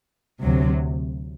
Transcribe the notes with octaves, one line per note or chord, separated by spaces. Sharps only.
D2 C3 F#3